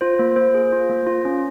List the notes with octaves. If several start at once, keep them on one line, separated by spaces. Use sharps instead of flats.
F4 C5
A#3 C5
A#3 C5
G#4
F4
A#3
F4
C#4